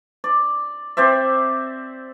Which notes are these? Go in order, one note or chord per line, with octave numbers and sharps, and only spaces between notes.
D5
C4 C5 D5 E5